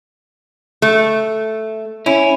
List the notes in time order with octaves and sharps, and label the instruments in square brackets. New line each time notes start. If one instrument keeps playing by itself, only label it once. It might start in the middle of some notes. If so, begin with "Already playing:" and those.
[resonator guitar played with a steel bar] A3
[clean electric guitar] C#4 [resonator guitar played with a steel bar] E4